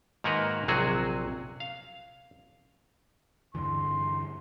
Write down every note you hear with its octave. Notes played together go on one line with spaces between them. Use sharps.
G#2 D#3 A#3 F#4 A#4 B4
A#1 C3 F#3 F#4 G#4
F5
G2 D3 E3 C6